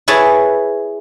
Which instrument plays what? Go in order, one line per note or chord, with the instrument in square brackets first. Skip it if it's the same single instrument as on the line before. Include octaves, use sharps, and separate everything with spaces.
[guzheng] E4 G#4 B4 C#5 A5